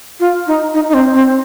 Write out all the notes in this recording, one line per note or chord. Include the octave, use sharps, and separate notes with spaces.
F4
D#4
D#4
D#4
C4
C4